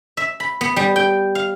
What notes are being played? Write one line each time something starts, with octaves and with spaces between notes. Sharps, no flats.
E5
B5
B3
G3
G5
F5